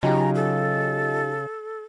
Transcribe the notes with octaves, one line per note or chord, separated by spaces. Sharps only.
C#3 F#3 D#4 F4 G4 D#5 G#5 A#5
A4